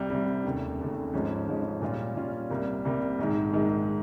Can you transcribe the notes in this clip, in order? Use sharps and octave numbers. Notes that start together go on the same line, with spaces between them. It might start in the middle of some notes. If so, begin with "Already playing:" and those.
Already playing: C2 C3 G3
C2 C3 G3
F1 D#2 C#3
F1 D#2 C#3
G#1 G#2 F3 G#3 C#4
G#1 G#2 F3 G#3 C#4
A#2 G3 C#4 F4
A#2 G3 C#4 F4
C2 C3 G3 A#3
C2 C3 G3 A#3
A#1 G#2 D#3 G#3
A#1 G#2 D#3 G#3